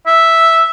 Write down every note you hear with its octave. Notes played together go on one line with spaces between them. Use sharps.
E5